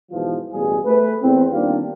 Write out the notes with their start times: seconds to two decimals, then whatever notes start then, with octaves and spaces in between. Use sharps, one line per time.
0.12 G#2 B2 E3 F3
0.52 A1 B2 G3 G#4
0.86 A3 B4
1.23 E2 C4
1.53 D#3 G3 A#3 D4 F4 G4